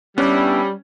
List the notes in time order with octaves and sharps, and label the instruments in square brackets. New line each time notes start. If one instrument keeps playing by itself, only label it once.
[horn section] G3 [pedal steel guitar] B3 D4 E4 [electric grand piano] C#4